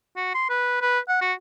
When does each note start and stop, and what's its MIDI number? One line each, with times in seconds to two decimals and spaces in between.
0.16 0.32 66
0.35 0.46 84
0.49 0.80 71
0.82 1.00 71
1.09 1.20 78
1.21 1.33 66